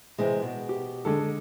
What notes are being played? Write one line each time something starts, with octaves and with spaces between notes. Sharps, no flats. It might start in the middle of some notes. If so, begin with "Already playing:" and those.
C3 E3 G#3
B2
G4
D3 G#3 A4